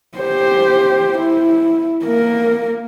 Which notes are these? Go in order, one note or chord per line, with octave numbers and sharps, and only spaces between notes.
G4 C5
E4
A#3 A#4